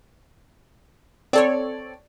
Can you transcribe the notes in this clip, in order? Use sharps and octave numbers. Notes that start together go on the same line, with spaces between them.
C4 A4 C#5 D5